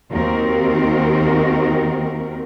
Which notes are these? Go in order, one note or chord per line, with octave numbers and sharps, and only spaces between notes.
D#2 D#3 C4 F#4 A#4